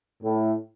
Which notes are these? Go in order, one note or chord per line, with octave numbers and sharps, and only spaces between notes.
A2